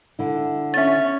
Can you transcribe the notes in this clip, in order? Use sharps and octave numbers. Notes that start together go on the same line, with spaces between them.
D3 E4
C#4 E5 A6